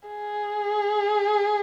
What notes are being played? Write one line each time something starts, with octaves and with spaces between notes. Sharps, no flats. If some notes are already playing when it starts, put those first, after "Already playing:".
G#4